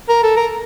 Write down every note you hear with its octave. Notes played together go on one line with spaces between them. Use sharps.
A#4
A4
A#4